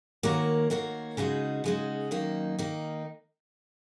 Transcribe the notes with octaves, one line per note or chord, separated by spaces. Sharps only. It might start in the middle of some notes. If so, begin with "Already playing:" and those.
D#3 A#3 F#4 A#4 C#5
D#3 A#3 F#4 A#4 C#5
C#3 G#3 D#4 F#4
C#3 G#3 D#4 F#4
F#2 D#3 A#3 D#4
D#3 A#3 D#4